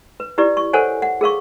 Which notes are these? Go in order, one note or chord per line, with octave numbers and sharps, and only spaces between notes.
B4
E4 G4 B4 D5
C#6
A4 A#4 C5 C#5 F#5 G#5
F#5
G#4 A#4 F5 C#6